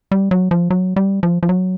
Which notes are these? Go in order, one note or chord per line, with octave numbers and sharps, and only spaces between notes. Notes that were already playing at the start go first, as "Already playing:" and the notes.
G3
F#3
F3
F#3
G3
F3
F3
F#3